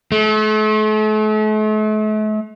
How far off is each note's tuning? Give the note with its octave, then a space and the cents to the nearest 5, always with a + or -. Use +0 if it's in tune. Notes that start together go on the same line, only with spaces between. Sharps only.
A3 -40